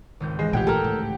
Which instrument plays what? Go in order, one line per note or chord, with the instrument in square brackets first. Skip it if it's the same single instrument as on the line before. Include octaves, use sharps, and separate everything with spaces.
[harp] G#1 C#2 G6
[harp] E3 A#6 E7 [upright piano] G#3
[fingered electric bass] A#1 A2 F3 [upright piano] G4 F#5 G5 [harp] G#6
[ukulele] A4 A#4
[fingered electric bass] A2